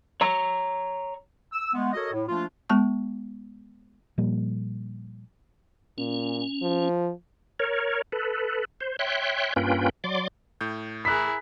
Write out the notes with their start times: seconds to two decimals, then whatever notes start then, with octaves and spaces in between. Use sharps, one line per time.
0.21 C#5 A#5
1.53 E6
1.73 G#3 A3 B3
1.93 F#4 A4 A#4 C#5 D#5
2.13 A2
2.29 F3 A3 A#3 D4 F4
2.69 G#3 B3 A5 C#6
4.18 A#2 F3 G3 A#3
5.98 A#2 C#4
6.62 F3
7.60 A#4 C#5
8.12 A4 B4
8.81 C5
8.99 C#5 E5 G5 C6 F#6
9.56 G2 A#3 C#4 F4 B4 G5
10.04 F#3 D5 C6 D6
10.61 A2 G6
11.05 E4 G#4 A#4 F#6 B6